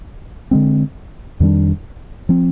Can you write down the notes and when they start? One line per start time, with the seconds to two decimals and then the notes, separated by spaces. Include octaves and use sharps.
0.51 D3 G#3 C4
1.40 F2 D#3 G3 D4
2.29 F3 C4